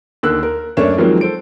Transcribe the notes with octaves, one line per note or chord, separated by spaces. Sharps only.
D#2 D3 A#3 E6 F#6
A#4
F#2 A3 A#3 D4 C#5 E7
D#3 F3 F#3 G#3 A#3 C4
A4 C5 D7